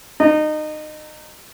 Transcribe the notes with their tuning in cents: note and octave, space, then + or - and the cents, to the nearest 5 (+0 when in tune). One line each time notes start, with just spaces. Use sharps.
D#4 -25